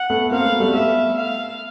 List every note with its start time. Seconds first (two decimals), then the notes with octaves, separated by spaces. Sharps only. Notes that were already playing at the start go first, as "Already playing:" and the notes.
Already playing: F#5
0.10 A3 B3
0.31 A#3 C4 F5
0.45 A3 B3
0.60 G3 A3
0.74 A3 B3 E5
1.17 F5